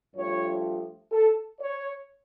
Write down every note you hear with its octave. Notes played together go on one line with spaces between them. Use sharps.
G2 F3 A3 C#5
A4
C#5